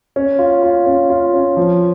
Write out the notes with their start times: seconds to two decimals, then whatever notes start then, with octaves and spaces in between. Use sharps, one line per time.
0.16 C#4
0.39 F4
0.63 F4
0.86 C#4
1.10 F4
1.34 C#4
1.57 F3